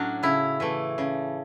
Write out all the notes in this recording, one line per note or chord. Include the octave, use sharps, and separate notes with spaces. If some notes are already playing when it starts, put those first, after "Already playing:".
Already playing: A2 F#3 C#4 D4 F#4
C#3 E4
E3 A3
C#3